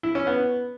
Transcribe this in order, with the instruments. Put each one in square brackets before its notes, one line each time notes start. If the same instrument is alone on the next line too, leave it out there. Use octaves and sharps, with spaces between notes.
[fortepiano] E4
C#4
B3